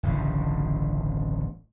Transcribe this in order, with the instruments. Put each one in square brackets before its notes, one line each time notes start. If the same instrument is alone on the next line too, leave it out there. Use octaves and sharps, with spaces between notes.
[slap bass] D1 A1 G2 C#3